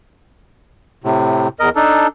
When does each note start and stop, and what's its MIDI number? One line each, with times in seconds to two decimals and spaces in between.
1.04 1.48 45
1.04 1.48 48
1.60 1.69 40
1.60 1.69 70
1.60 1.69 75
1.76 2.07 62
1.76 2.07 63
1.76 2.07 69